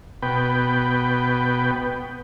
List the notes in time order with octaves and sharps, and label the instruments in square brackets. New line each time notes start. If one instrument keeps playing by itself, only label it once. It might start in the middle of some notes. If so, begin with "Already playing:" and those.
[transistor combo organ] B2 B4 G5